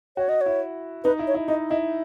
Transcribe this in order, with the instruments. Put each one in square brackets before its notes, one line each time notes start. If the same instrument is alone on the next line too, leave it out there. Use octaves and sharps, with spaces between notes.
[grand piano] F#4 [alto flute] C#5
[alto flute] D#5
[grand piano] E4 [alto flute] C#5
[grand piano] D#4 [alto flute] B4
[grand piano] E4
[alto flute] C#5
[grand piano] E4
[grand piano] D#4 [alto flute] D#5
[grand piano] E4 [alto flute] D#5